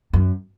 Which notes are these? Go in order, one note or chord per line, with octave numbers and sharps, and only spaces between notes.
F#2